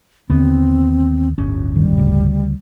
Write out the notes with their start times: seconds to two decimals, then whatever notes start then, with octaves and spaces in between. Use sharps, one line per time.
0.30 D#2 D3 B3 C4
1.38 D1 G1 C#4
1.75 F#1 D#3 G3
1.97 D2 C#3